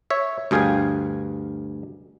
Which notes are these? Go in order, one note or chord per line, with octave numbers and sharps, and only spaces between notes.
C#5 E5
D2 G2 G#4 F5 G5 G#5